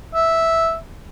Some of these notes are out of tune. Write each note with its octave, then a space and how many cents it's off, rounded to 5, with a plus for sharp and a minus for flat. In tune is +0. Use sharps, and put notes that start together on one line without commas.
E5 -5